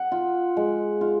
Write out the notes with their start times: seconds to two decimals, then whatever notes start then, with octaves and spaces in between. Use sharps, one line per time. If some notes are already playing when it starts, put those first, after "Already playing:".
Already playing: F#5
0.12 F4
0.57 G#3
1.01 F4